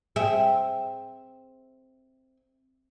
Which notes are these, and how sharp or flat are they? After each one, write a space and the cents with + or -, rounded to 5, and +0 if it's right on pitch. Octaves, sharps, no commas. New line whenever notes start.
C4 +0 G#4 +0 E5 +0